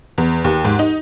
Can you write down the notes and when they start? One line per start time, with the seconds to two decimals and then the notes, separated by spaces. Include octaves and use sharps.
0.18 E2
0.44 D#2
0.65 G#2
0.79 D#4